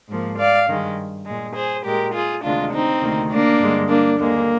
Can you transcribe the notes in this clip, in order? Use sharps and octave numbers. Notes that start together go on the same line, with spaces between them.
G#2 F3 A#3
D5 F5
G2 D#3 G#3
A#2 G#3
G#4 C5
A#2 G#3 G4 A#4
F4 G#4
D2 C3 D#3 G#3 D4 F4
C4 D#4
D2 C3 D#3 A#3
A#3 D4
G2 D3 G#3
A#3 D4
D#2 D3 G#3 A#3